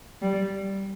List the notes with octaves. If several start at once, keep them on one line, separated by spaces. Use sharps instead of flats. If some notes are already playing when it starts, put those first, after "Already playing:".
G3